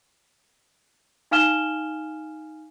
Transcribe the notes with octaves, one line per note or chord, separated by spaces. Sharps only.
D#4 F5 G#5 F6 E7 G7